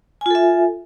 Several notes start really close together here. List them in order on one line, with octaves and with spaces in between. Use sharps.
G#5 F4 A4 E5